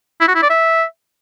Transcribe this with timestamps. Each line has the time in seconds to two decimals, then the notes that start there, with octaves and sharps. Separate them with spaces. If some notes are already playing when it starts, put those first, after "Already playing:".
0.21 E4
0.28 F#4
0.35 E4
0.42 D5
0.50 E5